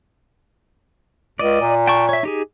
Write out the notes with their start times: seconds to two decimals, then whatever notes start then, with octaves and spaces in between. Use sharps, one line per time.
1.39 C#2 D5 D#5
1.61 A#2
1.87 G5 A5 C#6
2.09 C#5 E5
2.23 D#4 G4 G#4